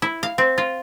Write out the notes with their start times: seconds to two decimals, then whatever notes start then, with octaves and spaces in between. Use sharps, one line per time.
0.02 E4
0.23 F5
0.38 C4
0.58 F4